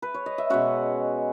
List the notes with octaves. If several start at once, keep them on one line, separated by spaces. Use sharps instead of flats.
B4
C#5
D#5
E5
B2 G#3 C#4 F#4 F#5